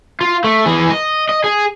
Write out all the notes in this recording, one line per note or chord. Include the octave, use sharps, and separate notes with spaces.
F4
A3
E3 G#4
D#5
D#5
G#4